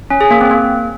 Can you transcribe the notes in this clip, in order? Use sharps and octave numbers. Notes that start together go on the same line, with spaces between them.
C#4
G#4
A#3
C4
A#3